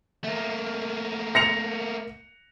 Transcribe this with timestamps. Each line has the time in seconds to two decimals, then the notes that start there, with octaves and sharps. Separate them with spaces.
0.24 A3 A#3
1.35 A#6 C#7 F7